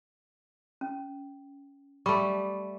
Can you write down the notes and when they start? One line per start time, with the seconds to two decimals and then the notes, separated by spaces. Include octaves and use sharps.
0.81 C#4
2.06 G3 A3 B5 C#6 D6